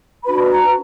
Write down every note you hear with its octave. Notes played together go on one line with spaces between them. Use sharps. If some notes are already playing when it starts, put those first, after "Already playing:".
D4 F#4 B4 B5
A#5